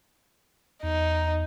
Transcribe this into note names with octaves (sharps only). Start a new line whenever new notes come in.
E2 D#4